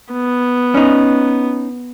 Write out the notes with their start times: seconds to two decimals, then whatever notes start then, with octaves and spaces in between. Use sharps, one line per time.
0.12 B3
0.75 C#4 D#4